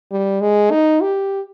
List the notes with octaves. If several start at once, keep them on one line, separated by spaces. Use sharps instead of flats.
G3
G#3
D#4
G4